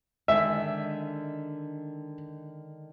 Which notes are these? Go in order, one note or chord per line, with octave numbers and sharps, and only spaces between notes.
D3 D#3 G#3 E5